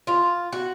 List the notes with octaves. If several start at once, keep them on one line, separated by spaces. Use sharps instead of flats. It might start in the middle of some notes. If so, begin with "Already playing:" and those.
F4
F#4